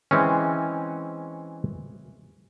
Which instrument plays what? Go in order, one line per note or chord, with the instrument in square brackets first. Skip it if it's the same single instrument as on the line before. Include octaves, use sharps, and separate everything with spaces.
[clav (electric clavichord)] E3 G#3 C4 C#4